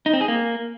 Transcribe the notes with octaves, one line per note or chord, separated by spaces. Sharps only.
D#4
C4
G#4
A#3